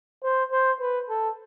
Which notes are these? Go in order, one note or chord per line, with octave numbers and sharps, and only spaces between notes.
C5
C5
B4
A4